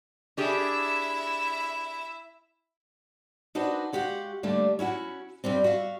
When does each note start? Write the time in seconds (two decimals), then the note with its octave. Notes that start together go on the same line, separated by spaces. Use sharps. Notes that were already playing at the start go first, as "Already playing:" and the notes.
0.37 D4 E4 G4 G#4 E5
3.55 D4 D#4 F#4 B4 C5 D#5
3.93 G#3 F#4 G4 F5 F#5
4.43 D3 G3 A3 A#3 D4
4.79 C#4 E4 F#4 F#5
5.44 G2 C3 G3 C4
5.64 F#4 E5 F5